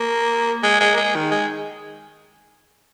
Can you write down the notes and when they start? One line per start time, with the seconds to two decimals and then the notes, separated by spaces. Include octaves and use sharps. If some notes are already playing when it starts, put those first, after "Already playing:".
Already playing: A#3
0.63 G#3
0.80 G#3
0.94 A#3
0.97 G#3
1.15 D#3
1.31 G#3